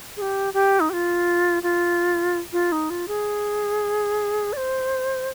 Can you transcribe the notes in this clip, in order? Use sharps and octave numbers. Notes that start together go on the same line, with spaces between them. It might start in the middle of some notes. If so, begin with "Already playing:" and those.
G#4
G4
G4
D#4
G4
F4
F4
F4
D#4
F4
G#4
D5
C5